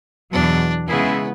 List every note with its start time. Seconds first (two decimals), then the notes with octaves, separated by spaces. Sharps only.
0.32 E2 B2 F#3 D4
0.88 C#3 G#3 B3 C#4 E4 G#4